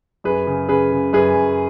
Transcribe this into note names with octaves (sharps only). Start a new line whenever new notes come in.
F#2 G#4 B4
C#3
C#3 G#4 B4
C#3
F#2 G#4 B4
F#2